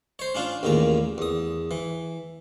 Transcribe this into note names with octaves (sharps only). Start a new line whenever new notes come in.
C5 C#5
C#4 D4 F4
A1 D#2 A#2 C#3 A#5
E2 D#6
E3